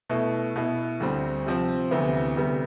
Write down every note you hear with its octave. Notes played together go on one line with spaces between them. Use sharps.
B2 A3 E4
B2 B3 E4
D2 D3 G3 C4
C3 F3 C4
D2 C3 E3 B3 E4
D2 C3 G3 B3